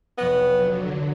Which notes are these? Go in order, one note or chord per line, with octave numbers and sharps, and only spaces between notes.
F1 B1 B3 A#6
D3 F#3